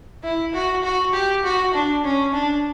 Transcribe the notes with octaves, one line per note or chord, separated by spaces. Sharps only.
E4
F#4
F#4
G4
F#4
D4
C#4
D4